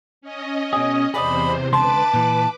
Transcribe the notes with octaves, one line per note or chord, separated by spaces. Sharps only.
C#4 D#5
B2 G#4
E2 C3 G#4 C5 D5 D#5 B5
C#2 D3 B4 A5 C6 D6
A#2 E3